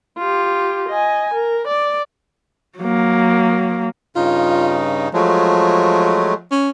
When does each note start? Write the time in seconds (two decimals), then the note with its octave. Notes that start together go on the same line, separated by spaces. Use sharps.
0.18 F4 G4
0.89 D#5 G#5
1.34 A#4
1.68 D5
2.78 F#3 A#3
4.16 G2 C#3 D#4 F4
5.14 F3 F#3 G#3 A3
6.51 C#4